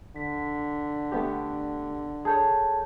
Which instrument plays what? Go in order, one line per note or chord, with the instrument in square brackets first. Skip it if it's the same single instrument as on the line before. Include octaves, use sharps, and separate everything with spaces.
[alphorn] D3 [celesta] B6
[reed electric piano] A3 B3 G4
[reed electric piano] G#4 A4 C#5 [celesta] A5 G6 G#6